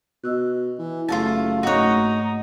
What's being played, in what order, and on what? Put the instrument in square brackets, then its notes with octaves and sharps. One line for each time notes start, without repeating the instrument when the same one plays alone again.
[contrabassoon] B2 [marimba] D#5 E6 F#6
[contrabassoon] E3
[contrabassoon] F#1 [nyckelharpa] A3 [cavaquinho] F4 F#4 A5
[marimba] G#2 A3 F#6 [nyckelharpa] D#4 [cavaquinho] F#4 C#5
[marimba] A#3